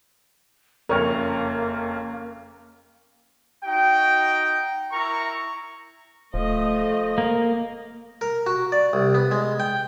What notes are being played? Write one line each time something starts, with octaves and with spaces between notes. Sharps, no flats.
F#1 F2 A#3 C#4 A#4 C#5
D#4 F#4 G5
E4 A#4 A#5 C#6
D1 F3 A3 D#5
A#3
A#4
F#4
D5
C2
B3
G#3
G5